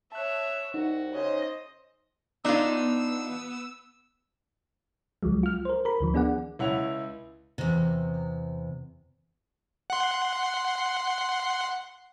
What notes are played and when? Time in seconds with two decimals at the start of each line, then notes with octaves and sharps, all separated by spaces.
0.12 C#5 E5 A5 F#6
0.74 C2 D#4 F#4
1.14 C#3 C5 D#5
2.45 B3 D4 D#4 F4 E6
5.23 C#2 F3 F#3 G#3
5.43 F4 F6
5.65 A#4 C5
5.85 A#4 B5
6.00 D2 D#3 F3
6.14 B3 D4 G#4 D5 F#5
6.59 C#2 E4 C#5 F#5 F7
7.58 E2 C3
9.90 F#5 C6